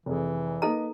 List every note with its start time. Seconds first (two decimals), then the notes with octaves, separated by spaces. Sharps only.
0.06 F1 E3 G#4
0.62 A#3 D#4 A4 B4 D#5 A#5